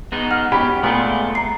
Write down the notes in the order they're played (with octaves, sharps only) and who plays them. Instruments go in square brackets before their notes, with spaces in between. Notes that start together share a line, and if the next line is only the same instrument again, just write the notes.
[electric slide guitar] G#3 B3 D#4
[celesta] F#5 F6
[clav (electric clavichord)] C#4 [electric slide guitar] G4 [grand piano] B5
[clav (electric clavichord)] A#2 B3 [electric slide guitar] G#3 A3
[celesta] A#5 C7